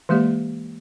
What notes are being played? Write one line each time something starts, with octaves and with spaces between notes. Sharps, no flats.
E3 G#3 A#3 G4 D5